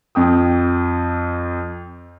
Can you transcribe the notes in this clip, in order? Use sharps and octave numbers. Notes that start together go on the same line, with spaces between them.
F2 G5 D#6